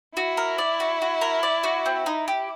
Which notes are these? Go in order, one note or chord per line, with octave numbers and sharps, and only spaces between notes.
E4 F#4
A#4
D5
F#4
F#4
A#4
D5
F#4
C4
D#4
G4